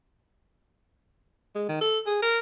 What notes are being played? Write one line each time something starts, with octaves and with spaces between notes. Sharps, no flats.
G#3
D#3
A4
G#4
A#4